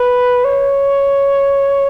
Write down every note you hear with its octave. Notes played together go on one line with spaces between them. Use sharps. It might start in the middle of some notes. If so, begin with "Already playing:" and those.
Already playing: B4
C#5